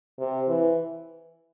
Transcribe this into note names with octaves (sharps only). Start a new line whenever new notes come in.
C3
E3